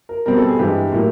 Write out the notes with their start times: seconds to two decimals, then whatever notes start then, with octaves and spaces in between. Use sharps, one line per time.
0.09 A#4
0.26 B2 G3 C4 A#4
0.37 A4
0.48 G#4
0.59 G2 E3 G#3 G4
0.92 A2 F#3 A#3